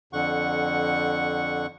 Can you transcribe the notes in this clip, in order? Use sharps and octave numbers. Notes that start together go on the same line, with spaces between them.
F2 D3 F#5 C#6